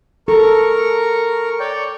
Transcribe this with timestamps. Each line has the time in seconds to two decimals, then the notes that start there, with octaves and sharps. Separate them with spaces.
0.28 A4 A#4 C#6
1.60 C#5 D5 G5